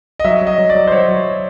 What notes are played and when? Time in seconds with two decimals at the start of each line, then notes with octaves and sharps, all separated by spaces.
0.20 D#5
0.24 F#3 E5
0.41 F#3
0.47 D#5
0.58 F#3
0.70 D5
0.75 F#3
0.87 C5
0.92 F#3 C#5
1.08 F#3